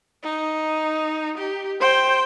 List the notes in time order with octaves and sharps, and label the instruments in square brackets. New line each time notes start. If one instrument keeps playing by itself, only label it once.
[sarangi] D#4
G4
[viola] C5 [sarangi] G5